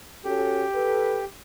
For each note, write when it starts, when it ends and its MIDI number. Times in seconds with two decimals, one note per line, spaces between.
0.24 0.64 61
0.24 0.64 66
0.24 1.25 67
0.24 0.64 69
0.75 1.18 69
0.75 1.18 71